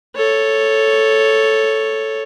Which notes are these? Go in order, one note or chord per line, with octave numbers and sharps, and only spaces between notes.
A4 C#5